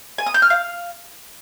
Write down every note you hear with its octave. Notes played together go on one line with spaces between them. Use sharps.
G#5
D#6
G6
F6
F5